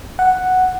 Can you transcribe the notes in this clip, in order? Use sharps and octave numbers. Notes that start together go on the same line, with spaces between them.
F#5